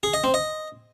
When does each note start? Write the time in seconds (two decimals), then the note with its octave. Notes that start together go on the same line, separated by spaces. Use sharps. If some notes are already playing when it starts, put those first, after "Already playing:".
0.03 G#4
0.14 D#5
0.24 C4
0.34 D#5